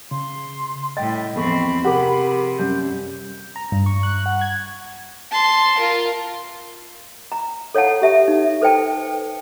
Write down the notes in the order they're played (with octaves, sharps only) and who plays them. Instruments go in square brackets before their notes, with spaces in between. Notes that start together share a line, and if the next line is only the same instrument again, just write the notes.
[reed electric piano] C#3 [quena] C6
[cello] A2 G3 [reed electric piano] D#5 G5 [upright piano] A6
[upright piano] E2 A4 C#6 [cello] F3 C4 [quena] B5
[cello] C3 [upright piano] G4 G#4 D6 [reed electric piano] A#4 F#5
[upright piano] F#2 G3 [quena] G6
[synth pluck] A#5
G2
C#6
F#6
F#5
G#6
[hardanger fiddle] A5 C6
F4 A#4
[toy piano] A#5
A4 C#5 F5 F#5 A5
G4 E5 A5
D#4
A4 B4 C5 G5 A5